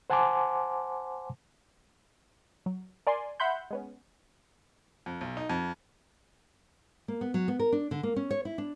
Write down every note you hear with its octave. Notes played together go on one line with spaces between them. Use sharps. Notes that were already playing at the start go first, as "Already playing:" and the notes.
C5 F#5 G#5 A5 C6 D6
F#3
A#4 D5 G#5 C6
E5 F#5 B5 C6 G6
G#3 B3 C#4
F2
B1
D#4
F2
A#3
B3
F#3
B3
A#4
D4
D3
A#3
C#4
C#5
E4
D4